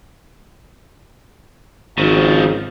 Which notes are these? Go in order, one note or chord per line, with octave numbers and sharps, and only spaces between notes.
G#1 C#3 F3